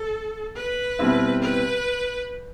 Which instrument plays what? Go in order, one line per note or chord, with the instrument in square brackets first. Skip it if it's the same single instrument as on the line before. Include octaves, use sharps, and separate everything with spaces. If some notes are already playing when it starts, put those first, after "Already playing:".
Already playing: [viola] A4
B4
[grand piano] B2 G3 C4 E4
[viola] B4